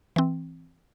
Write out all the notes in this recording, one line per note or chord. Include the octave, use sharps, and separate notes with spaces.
E3 C4